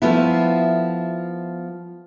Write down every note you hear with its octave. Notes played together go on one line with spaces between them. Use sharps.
F3 A3 B3 E4